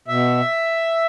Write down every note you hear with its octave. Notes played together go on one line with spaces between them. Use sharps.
B2 E5